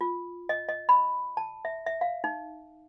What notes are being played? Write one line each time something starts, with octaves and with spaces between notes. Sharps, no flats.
F4
D#5
D#5
B5
A5
E5
E5
F5
D#4